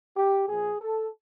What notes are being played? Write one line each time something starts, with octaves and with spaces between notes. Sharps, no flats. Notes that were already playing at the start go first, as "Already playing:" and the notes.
G4
A#2 F3 G#4
A4